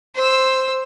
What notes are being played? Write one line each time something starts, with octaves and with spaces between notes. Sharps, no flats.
C5 E6